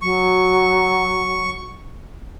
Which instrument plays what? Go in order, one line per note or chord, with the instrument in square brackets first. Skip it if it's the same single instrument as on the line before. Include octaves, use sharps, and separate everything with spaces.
[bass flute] F#3 [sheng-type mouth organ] C#6